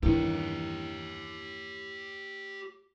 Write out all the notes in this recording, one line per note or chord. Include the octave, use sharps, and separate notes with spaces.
E2 G2 D#3 E4 G4 C#5